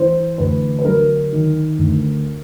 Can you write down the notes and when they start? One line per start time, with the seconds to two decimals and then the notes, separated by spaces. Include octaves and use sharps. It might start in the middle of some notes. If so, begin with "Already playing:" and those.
Already playing: E3 C5
0.38 D2 B4
0.79 B4
0.85 F#3 A#4
1.32 D#3
1.79 D2